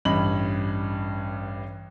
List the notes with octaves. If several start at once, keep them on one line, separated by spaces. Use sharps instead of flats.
A1 G2 D#5 B5 F#7